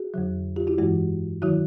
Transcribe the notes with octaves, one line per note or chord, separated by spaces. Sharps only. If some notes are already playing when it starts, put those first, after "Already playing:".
Already playing: F#4 G#4
F2 D3 F#3
F4 G4
E4 F#4
G2 E3 G#3 E4 F#4
D#3 F#3 E4 F#4